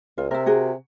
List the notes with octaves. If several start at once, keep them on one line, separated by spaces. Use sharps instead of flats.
C#2 F4
C3 A#4 E5
F#4 G#4 A#4